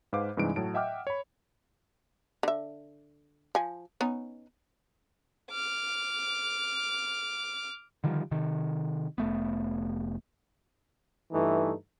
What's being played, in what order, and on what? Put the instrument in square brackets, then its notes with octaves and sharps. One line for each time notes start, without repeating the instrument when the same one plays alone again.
[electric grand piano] G#2 B4 C5 F5 D6
G2 C3 E3 G#3 D#4 D7
A2 F#3 A5 D7
D#5 E5 F#5 G5 D6 F6
C#5 B5
[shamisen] D3 E5
F3 G#5
B3 C#4 D#4
[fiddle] D6 F6
[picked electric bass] D3 D#3 F3 G3
C3 D#3
F1 A3 B3
[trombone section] G2 E3 A3 D#4